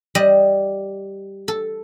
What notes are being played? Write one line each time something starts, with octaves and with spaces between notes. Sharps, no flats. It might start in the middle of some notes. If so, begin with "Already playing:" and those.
G3 D#5
A4